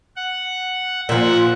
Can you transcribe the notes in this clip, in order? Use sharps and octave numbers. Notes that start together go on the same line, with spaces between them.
F#5
A#2 F3 E5 F#5 F#6